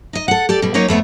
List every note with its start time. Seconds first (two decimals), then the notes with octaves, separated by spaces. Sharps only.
0.13 D#4 D#5
0.28 A4 F#5
0.49 G4 A4 D5
0.62 B2 G3
0.74 F#3 A#3 C#4 D#4 C#5
0.88 F2 A3 B3 C#5